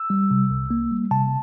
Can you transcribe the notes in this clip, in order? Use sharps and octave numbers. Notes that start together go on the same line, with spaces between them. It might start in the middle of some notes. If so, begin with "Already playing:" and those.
Already playing: E6
G3
C3
C2
A#3
G3
C3 A5